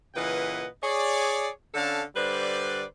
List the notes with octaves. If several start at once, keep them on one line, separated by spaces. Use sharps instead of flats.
A#2 C#3 E3 B4 D#5 F#5
G#4 C#5 D5
D3 C#4 D4 A4 F5 A5
D3 G3 B4 C5 D5